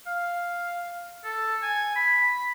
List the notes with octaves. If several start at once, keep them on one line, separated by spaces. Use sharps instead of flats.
F5
A4
G#5
B5